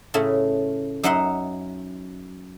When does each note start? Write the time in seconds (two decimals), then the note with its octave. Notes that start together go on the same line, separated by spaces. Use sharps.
0.14 A2 C#3 A3
1.03 F#2 D#4 E5 F#5 A#5 C6